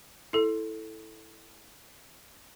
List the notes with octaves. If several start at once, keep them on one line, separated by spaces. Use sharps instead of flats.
E4 A4